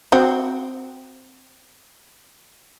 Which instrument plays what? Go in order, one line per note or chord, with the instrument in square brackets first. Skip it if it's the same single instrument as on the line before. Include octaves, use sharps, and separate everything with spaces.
[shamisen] C4 F#4